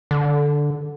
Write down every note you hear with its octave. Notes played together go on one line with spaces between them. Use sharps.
D3